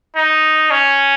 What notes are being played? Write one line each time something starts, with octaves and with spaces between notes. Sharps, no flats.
D#4
C#4